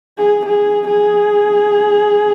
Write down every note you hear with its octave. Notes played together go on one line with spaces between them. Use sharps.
G#4
G#4
G#4